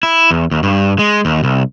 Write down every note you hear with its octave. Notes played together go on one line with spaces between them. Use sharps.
E4
E2
D#2
G2
G#3
D#2
C2